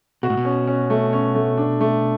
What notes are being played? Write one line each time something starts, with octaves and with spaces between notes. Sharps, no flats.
B2 F#4
A2
B2
C#4
C#4
A3
C#4
A3
D4
A3